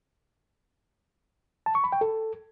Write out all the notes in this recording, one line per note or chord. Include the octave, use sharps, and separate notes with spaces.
A5
C#6
B5
G5
A4